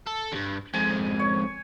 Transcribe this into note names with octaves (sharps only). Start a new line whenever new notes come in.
A4
D2 G2
F2 G#2 G#5
C#5